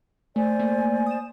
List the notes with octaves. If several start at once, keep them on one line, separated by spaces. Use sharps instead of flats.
A3 C5 D5 G#5
A3 A#3
D#6 E7